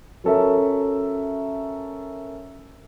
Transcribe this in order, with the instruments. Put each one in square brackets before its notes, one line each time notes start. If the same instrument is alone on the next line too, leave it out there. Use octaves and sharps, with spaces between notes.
[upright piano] F#3 C#4 A4 A#4 E5